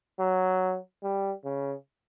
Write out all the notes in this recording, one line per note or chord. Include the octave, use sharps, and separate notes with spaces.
F#3
G3
C#3